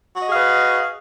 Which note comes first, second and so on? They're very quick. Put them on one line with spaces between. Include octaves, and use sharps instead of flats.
F#4 D#5 G#4 F5 B4